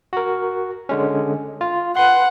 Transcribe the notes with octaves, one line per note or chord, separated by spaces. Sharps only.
F#4 A#4
D3 G#3 C#4
F4
B4 F#5 C6